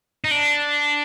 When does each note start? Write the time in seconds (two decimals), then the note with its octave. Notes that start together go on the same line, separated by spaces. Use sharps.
0.24 D#4
0.31 D4